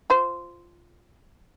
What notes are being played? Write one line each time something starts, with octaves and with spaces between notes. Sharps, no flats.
F4 C5